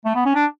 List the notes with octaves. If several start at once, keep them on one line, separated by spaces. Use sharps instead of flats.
A3
B3
C#4
D4